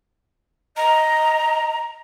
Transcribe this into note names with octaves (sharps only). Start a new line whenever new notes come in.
D#5 A#5